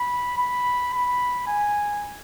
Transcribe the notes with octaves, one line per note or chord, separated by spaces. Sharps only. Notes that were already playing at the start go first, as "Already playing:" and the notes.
Already playing: B5
B5
B5
G#5